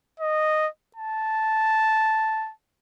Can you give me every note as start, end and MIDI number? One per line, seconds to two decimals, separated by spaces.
0.20 0.68 75
0.96 2.52 81